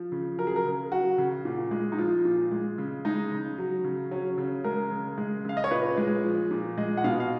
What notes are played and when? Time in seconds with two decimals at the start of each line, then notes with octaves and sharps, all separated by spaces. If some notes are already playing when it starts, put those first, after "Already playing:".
Already playing: F3
0.12 C#3
0.38 F#3 A#4
0.47 G#4
0.56 A#4
0.65 C#3
0.91 F#3 F#4
1.18 C#3
1.45 A#2
1.71 G#3
1.92 D#4
1.98 F3 F4
2.25 A#2
2.52 G#3
2.78 C#3
3.05 G#3 D#4
3.31 C#3
3.58 F#3
3.84 C#3
4.11 F#3 C#4
4.38 C#3
4.64 G#3 A#4
4.91 C#3
5.18 G#3
5.45 C#3 F5
5.57 D#5
5.64 C#5
5.71 A#2 B4
5.98 G#3
6.24 F3
6.51 A#2
6.78 G#3 D#5
6.97 F#5
7.04 B2 F5
7.20 F5